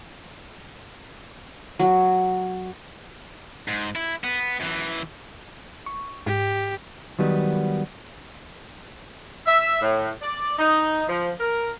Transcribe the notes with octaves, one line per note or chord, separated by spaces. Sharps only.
F#3
G#2
E4
B3
F#2 E3
C#6
G#2 G4
D#3 F#3 G3 B3
E5
A2
D5
D#4
F3
A#4